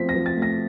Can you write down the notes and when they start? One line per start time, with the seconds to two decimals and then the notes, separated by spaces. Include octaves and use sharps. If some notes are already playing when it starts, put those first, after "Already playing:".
Already playing: F3 A3 C4 B6
0.09 A#6
0.14 F3
0.26 A6
0.37 A3
0.42 A#6